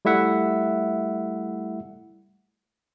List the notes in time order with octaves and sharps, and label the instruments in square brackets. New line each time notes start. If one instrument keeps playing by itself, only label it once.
[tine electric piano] G3 A3 E4 E5 F#5